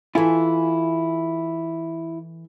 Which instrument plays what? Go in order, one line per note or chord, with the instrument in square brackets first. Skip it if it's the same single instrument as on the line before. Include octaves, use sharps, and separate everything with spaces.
[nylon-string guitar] E3 A4 G#5 [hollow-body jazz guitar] E4 F4